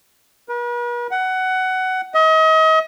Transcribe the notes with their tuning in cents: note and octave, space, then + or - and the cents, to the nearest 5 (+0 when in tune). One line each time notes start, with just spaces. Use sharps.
B4 -45
F#5 +15
D#5 +35